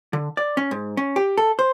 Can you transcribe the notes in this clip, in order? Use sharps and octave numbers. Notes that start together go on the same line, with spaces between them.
D3
D5
C#4
G#2
C#4
G4
A4
C5